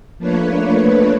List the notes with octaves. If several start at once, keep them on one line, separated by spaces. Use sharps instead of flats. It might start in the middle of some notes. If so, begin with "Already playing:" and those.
F3 A3 A#3 D4 B4 C#5